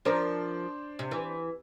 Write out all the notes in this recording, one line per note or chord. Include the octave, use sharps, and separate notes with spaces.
F3 D4 A#4 C5 D5
C3
E3